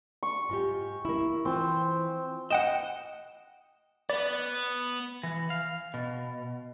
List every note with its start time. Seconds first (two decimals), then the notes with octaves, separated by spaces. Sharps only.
0.23 C#6
0.49 G#2 F4 G4
1.05 A#3 E4
1.45 E3 C4 F4
2.50 D#5 F#5 G5 E7
4.10 B3 D5
5.23 E3
5.50 F5
5.94 B2